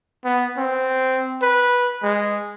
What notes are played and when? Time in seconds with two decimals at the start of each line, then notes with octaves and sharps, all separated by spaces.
0.25 B3
0.57 C4
1.42 B4
2.03 G#3